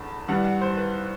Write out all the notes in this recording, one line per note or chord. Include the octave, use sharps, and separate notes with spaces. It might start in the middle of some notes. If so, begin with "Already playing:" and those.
Already playing: F#1 E2 D3 A5 B5
G2 E3 G3 F#5
F#5
C5
B4